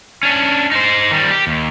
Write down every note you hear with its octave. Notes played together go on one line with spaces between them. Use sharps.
C#4 D4
D#4 C5
D#3 G3
G4
D#2